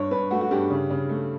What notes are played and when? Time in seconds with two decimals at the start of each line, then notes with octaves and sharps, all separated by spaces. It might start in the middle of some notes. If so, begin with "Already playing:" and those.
Already playing: G2 C#5
0.11 G2 B4
0.31 A3 F#4
0.41 F#4
0.51 G2 G4
0.70 C#3
0.90 C#3
1.09 A3